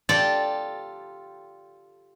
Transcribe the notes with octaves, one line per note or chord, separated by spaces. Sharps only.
F4 G4 A4 D5